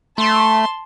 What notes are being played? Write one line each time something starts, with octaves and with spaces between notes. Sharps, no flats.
A3 A5 C6